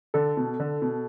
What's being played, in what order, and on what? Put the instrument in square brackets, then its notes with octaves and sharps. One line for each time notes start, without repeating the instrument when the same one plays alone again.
[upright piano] D3 [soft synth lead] A4
[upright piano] B2
D3
B2